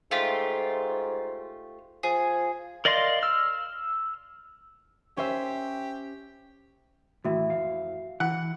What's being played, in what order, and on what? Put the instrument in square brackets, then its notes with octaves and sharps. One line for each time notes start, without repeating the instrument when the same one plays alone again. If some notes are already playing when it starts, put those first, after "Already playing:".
[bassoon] G#2 [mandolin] A3 F4 G4
[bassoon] F3 [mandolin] G#4
[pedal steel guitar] A#4 D5 D#5 F5 C6
E6 F6
[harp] C#4 C5 E5 [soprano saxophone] G4
[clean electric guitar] D#2 A2 E3 [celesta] F#4 E5
[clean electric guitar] F2 F5
[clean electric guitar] E3 [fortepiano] F#5